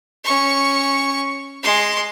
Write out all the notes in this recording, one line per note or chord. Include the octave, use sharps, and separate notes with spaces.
C#4 C#6
G#3 C6